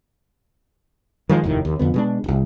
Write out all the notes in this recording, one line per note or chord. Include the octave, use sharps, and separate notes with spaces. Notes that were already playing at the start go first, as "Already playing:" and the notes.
D#3 F3 G#3
F1 D#2 A2 D#3
D#2
F2 D3 B3
B2 G#3 D4
D#1 C2